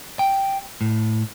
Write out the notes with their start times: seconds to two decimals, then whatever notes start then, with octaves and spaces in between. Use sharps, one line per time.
0.19 G5
0.81 A2